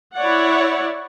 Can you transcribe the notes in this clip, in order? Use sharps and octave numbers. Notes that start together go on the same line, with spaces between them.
E4 C#5 D5 F#5